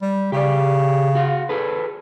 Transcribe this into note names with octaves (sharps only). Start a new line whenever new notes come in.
G3
C#3 G4 D5
F#4 F5
G#4 A4 B4